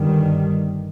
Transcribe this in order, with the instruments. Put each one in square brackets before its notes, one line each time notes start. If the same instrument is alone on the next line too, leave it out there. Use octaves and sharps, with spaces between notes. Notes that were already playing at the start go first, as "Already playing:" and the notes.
Already playing: [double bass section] G1 G2 D#3 G3